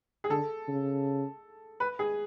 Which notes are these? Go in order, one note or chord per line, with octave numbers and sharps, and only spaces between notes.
G#4
D3 A4
C#3
B4
G#4